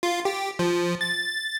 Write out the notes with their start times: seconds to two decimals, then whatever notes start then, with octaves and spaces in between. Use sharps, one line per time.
0.03 F4
0.25 G4
0.59 F3
1.01 A6